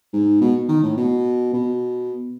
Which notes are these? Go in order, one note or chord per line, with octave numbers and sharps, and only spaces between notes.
G#2
B2
D#3
A2
B2
B2